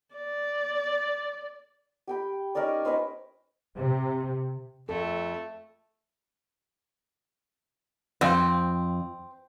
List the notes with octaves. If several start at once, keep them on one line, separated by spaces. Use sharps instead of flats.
D5
G4 G5 B5
C#4 D#4 A#4 D5
C#4 D#4 B4 C5
C3
F2 A3 A4
F2 C4